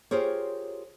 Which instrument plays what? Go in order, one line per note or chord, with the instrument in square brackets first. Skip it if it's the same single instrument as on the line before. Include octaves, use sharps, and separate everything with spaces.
[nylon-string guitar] F4 G4 G#4 A#4 C5 C#5